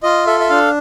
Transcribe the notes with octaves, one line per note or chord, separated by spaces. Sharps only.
F4 D#5
A4 E5
E5
D4 F5